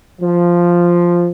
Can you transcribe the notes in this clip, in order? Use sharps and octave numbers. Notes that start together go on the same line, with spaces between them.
F3